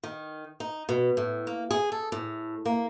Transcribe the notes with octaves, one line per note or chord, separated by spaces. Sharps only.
D#3
D#4
B2
A2
A#3
G#4
A4
A2
A#3